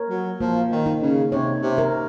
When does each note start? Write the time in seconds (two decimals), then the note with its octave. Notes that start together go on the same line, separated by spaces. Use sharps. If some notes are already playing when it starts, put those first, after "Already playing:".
Already playing: A#4 C#5
0.10 F#3
0.40 F3 A#3
0.71 D#3
0.86 D#4
1.02 C#3
1.32 C3 C#5
1.62 C3
1.78 A#4